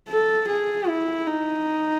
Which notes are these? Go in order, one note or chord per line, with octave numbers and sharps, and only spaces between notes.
A4
G#4
E4
D#4